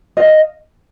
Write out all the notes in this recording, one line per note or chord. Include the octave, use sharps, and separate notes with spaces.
D#5 F5